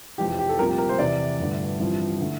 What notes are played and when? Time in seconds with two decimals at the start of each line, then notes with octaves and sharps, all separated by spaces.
0.18 F1 F2 E3 G4
0.29 G4
0.39 G4
0.49 A4
0.58 C2 A#2 F3 A3 C4 A#4
0.69 G4
0.78 A#4
0.89 C5
0.98 E2 C3 E3 D5
1.39 G1 G2 D3 A3
1.79 A1 G2 F3 C4 E4
2.21 D3 A3 E4